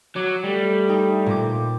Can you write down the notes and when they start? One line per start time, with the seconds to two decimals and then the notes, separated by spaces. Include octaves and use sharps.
0.16 F#3 D6
0.44 G3 A3
0.89 D#4 G5
1.26 A#2 C4 D6